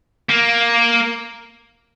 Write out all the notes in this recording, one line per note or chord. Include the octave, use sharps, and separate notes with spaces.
A#3